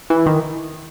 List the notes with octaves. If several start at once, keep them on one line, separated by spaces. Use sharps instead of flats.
E3
D#3